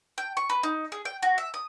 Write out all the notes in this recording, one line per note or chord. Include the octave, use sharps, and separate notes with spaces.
G5
C#6
B4
D#4
G#4
G5
F#4
E5
D#6